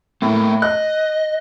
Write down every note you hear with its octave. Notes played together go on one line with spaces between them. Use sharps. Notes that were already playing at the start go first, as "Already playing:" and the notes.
A2 A#3 A4 A#4
D#5 F#6